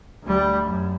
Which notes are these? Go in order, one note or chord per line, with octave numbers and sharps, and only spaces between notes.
D2 G3
F#2